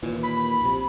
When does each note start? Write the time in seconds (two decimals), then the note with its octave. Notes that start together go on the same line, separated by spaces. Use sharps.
0.02 D#2 A#2 E3
0.23 B5
0.60 A#1 C3